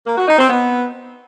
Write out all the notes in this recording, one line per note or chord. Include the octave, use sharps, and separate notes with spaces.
A#3
F#4
D#4
C4
B3